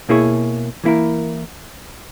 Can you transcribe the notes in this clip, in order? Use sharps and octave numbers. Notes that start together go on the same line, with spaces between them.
B2 A#3 E4 G#4 C#5
E3 A#3 E4 A#4